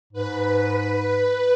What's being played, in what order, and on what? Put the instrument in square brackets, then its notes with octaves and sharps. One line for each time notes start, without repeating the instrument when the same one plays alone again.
[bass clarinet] G#2 [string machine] B4